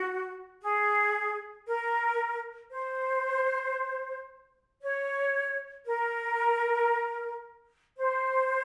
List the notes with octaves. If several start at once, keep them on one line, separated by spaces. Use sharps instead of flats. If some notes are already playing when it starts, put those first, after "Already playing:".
Already playing: F#4
G#4
A#4
C5
C#5
A#4
C5